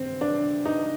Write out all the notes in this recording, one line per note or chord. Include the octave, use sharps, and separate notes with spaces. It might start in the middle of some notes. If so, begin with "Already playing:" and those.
Already playing: G2 D#3 C4
D4
D#4